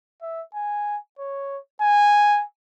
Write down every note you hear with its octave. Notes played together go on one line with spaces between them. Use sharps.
E5
G#5
C#5
G#5